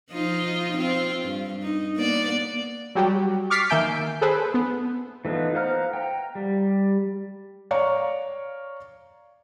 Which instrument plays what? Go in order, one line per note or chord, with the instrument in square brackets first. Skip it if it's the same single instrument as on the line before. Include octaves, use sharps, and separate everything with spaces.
[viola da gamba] F3 D#4 F4
C4 F4
G2
D#4
A#3 B3 D5
[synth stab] F#3 G3 F#4 G4
C#6 D6 F6 A6 B6 C7
D#3 A#3 E5 G#5 G6 D7
G#4 A4 B4 C5
B3
[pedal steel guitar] E3 A3 B3 D#4 F4
C5 F5 F#5 A#5 F6
G5 A#5
G3
[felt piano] C#5 D5 F5 A#5 C#6